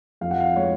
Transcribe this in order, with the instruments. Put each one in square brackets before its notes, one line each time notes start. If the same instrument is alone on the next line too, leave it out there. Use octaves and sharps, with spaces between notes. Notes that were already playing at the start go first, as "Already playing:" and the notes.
[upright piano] F2 F5
F#5
F5
G#3 C#5